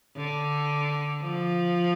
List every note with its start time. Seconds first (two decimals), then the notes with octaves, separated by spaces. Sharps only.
0.17 D3
1.23 F3